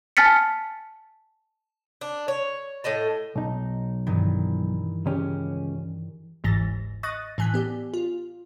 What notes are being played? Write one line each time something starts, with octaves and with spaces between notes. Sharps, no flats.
G#5 A5 F6 A6 B6 C#7
D4
C#5
A2 A3 D#5 A5
B1 D#4
G2 D#3 E3
C#2 C#4 G4
G1 D2 G#2 E3 A6 A#6
D#5 C#6 D#6 F#6 A6 A#6
A2 E3 G#5 F#6 B6
B3 G4 D5
F4